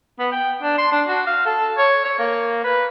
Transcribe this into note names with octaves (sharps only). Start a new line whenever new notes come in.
B3
G5
D4
C6
D4
F#4
F5
A4
C#5
C#5
A#3
B4